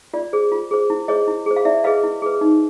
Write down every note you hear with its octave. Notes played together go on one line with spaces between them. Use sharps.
F4 D5
G#4 C5
F4
G#4 C5
E4
G#4 C5 C#5 D#5
E4
G#4 C5
F5
E4 D5 E5
G#4 B4 D#5 F5
E4
G#4 B4
D#4